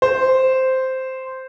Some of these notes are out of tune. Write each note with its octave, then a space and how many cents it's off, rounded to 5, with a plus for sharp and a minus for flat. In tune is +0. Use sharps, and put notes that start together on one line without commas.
C5 -5